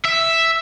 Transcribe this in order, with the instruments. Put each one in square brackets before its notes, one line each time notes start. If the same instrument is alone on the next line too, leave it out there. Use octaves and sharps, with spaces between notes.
[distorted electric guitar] E5